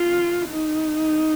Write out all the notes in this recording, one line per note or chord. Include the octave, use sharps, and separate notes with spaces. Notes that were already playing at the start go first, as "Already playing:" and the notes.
Already playing: F4
D#4